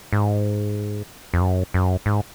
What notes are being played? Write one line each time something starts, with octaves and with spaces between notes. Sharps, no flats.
G#2
F2
F#2
F#2
G#2